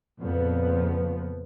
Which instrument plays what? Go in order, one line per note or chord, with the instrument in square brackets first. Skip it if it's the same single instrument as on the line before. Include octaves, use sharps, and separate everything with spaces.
[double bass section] F2 A#2 C#3 F3 B3